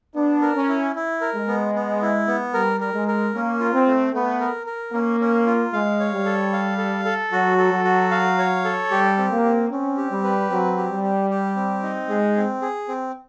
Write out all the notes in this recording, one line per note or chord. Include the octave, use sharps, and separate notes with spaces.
B3 D4
A#4
C#4
E4
E4
A#4
G#3
B3
B3
E4
B3
G3 A#4
A#4
G#3
A#4
A#3 C#4
F4
C4
A3
A3 B3
A#4
A#4
A#3 C#4
C#4
F4
G#3 F5
C#5
G3
A4
F5
A4
A4
F#3 F#4
A4
F#3
F#4
F5
C#5
A4
G3 G4
C4
A#3
C4
C4 C#4
G4
G3
B4
F#3 C4
G4
G3
G4
G4
C4
D#4
G#3 G#4
C4
G#4
C4